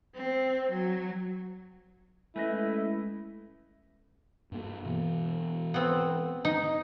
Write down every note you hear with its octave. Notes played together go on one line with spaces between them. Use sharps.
C4
F#3
G#3 A3 C#4 E4 B4 D#5
G2 A#3
B2 E3
B3 C4
D#4